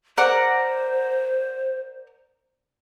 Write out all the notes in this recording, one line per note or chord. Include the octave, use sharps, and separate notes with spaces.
A#4 C5 D5 F#5